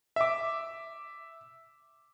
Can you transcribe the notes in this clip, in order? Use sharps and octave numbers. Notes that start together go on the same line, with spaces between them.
E5 D6